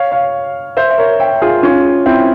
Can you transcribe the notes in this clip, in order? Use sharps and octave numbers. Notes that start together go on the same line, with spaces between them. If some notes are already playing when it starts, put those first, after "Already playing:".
Already playing: C#5 F5
C#5 F5
C5 E5
E5
A#4 C#5
E5 G5
F4 G#4
C#4 F4
C4 E4